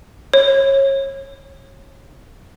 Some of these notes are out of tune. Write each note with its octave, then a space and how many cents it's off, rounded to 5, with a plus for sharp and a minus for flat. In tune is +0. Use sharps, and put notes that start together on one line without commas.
C#5 -25